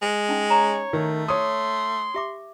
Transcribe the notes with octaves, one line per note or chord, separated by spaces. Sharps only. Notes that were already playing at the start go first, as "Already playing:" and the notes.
G#3
C#4 D#4
C#5 A#5
D#3 A3
C#5 C6 D#6
G4 E5 D6